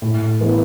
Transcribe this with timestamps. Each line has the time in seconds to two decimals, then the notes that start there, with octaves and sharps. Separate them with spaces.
0.02 A2
0.41 E3 B3